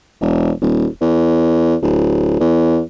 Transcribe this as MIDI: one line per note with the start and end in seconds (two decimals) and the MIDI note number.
0.21 0.51 28
0.61 0.86 27
1.01 1.75 40
1.82 2.38 26
2.40 2.80 40